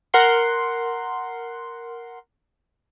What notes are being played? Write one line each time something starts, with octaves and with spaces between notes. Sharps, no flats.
A#4 F#5 C6